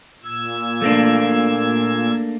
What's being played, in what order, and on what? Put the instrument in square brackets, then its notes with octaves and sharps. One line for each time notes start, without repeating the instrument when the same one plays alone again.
[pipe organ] A#2 E6 G#6
[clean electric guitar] A3 A#3 D4